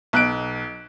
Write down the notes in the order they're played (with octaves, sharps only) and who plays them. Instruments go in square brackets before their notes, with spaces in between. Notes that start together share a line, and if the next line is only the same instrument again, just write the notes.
[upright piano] B1 F#6 D7